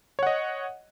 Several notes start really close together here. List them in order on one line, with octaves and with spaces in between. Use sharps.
C#5 F#5 D#5